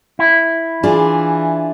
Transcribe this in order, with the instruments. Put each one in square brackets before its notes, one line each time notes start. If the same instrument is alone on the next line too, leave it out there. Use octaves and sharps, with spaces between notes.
[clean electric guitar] E4
[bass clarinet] E3 [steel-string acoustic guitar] D4 F4 G#4